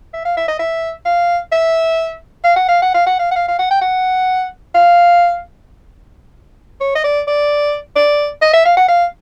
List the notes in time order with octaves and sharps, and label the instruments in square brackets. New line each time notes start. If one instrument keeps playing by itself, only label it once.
[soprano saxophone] E5
F5
E5
D#5
E5
F5
E5
F5
F#5
F5
F#5
F5
F#5
F5
F#5
F5
F5
F#5
G5
F#5
F5
C#5
D#5
D5
D5
D5
D#5
E5
F5
F#5
F5